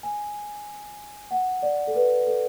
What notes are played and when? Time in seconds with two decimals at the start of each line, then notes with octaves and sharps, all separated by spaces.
0.03 G#5
1.31 F#5
1.62 D5
1.87 A4
1.94 B4
2.27 A4